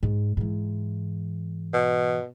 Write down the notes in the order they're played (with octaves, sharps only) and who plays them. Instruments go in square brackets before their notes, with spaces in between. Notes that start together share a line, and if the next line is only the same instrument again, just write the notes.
[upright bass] G#2
G#2 E3
[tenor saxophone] B2